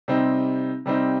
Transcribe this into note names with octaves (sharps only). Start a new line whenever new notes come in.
C3 G3 C4 D#4
C3 G3 C4 D#4